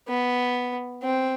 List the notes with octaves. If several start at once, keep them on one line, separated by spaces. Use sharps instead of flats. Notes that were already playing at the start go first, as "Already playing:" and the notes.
B3
C4